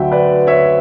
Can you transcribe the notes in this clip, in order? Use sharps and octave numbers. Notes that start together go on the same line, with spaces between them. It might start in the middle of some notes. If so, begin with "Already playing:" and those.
Already playing: D2 D3 F#3 E5 G5
B4 D5
C#5 E5